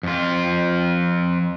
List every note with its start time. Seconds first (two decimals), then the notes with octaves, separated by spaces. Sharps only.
0.03 F2 F4